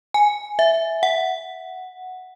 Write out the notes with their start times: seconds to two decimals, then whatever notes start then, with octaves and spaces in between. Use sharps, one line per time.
0.14 G#5
0.59 E5
1.03 F#5